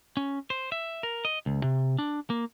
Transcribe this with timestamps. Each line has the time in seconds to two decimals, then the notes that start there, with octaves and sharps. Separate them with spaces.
0.17 C#4
0.50 C5
0.72 E5
1.03 A#4
1.25 D#5
1.46 C#2
1.63 C3
1.98 D4
2.30 A#3